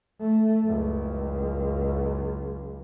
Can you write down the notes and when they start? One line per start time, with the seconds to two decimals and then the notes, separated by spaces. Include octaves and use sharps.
0.21 A3
0.66 F#1 C#2